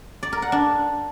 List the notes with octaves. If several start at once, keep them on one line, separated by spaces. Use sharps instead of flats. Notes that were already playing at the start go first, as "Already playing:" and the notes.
D5
A#4
F#5
D4